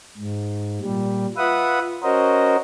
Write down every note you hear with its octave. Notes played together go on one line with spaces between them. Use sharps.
G#2
A#2 G3
F4 B4 E5 F#5 D#6
C#4 F#4 A#4 C5 D#5